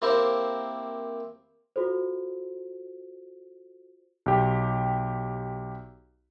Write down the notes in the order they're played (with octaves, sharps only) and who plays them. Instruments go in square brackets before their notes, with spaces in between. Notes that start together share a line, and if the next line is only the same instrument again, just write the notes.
[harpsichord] A#3 C4 E4 G4
[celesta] F4 F#4 A4 C5
[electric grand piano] B1 G4